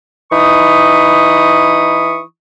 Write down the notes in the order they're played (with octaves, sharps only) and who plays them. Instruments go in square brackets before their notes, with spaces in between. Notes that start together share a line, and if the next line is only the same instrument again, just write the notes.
[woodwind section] E3 D#4 B5 C#6 D#6